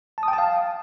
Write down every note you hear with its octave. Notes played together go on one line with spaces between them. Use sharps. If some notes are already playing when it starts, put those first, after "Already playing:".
A5
D#6
G5
A5
F5